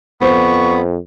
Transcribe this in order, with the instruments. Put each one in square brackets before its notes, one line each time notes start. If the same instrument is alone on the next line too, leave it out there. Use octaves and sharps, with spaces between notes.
[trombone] F2 [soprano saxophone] B3 [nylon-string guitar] C5 [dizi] C#6